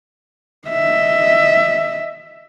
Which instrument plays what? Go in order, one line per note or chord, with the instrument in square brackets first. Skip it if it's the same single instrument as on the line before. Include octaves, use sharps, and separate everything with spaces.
[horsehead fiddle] D#5 E5